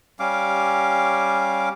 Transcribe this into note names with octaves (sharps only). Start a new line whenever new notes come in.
G3 C#4 F5 D6